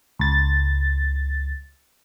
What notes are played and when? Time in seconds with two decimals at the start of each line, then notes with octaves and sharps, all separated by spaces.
0.19 C#2 A6